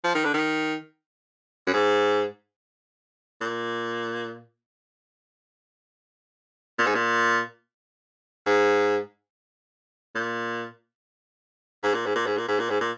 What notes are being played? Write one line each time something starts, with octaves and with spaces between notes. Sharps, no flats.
F3
D#3
D3
D#3
F#2
G#2
A#2
A#2
G#2
A#2
G#2
A#2
G#2
A#2
G#2
A#2
G#2
A#2
G#2
A#2
G#2
A#2